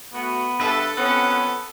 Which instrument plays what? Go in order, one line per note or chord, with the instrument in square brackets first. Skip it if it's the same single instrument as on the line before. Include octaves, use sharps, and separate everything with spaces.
[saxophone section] A3 F#4 [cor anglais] B3
[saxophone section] G2 [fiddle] A4 [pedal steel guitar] B4 E5
[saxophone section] F2 C#4 [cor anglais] B3 [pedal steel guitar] F#5